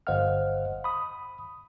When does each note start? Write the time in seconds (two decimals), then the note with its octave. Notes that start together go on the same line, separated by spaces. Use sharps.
0.07 G1 C5 D#5 F5 F#5 F6
0.84 B5 D#6